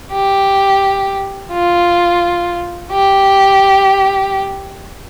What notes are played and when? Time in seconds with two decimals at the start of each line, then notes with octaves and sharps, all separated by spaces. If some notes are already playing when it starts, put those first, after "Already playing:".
0.12 G4
1.52 F4
2.91 G4